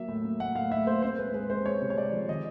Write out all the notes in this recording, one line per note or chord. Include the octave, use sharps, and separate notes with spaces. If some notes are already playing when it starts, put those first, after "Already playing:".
Already playing: F#3 A#3 E5
A2
A#3
A2 F#5
A2 F5
A2 E5
A#3 C5
C4 C5
G#3 B4
G#3 B4
G#3 C5
G#3 C#5
C3
C#5
G#3 D5
F3
D#3 D#5